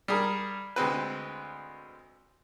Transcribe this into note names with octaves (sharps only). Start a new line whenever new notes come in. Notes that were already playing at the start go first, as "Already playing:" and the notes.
G3 G#4 A#4
D2 G#3 C4 B4